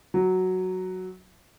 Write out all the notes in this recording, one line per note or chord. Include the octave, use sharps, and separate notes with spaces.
F#3